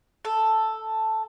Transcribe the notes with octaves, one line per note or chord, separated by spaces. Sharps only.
A4